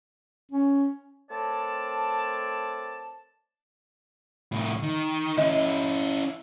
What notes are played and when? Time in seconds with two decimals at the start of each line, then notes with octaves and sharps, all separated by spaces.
0.52 C#4
1.30 A3 C4 A#4 C#5 D5 A5
4.52 C2 A2
4.83 D#3
5.37 C#4 E4 D#5